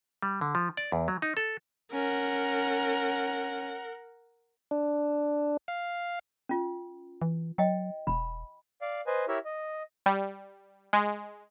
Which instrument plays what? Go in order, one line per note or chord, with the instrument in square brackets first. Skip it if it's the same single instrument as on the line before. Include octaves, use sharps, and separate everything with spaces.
[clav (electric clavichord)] G3
D3
F3
D5
E2
F#3
D#4
A4
[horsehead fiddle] C#4 [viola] A#4 F#5
[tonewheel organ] D4
F5
[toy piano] C#4 F4
[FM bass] E3
[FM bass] F#3 [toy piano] D#5 G5
[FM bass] E1 [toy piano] B5
[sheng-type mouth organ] D5 F5
B4 C5 D#5 G#5
E4 G4 A#4 C#5 E5
D#5
[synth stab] G3
G#3